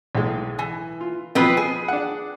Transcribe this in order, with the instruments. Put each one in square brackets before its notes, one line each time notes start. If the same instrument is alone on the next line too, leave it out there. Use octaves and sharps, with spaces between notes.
[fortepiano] B1 A2 G#3
[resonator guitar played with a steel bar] E3 [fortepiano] G#5
[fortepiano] F4
[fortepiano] B2 F3 [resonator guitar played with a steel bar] B3 C4 B4
[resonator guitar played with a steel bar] G#4
[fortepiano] D4 F#5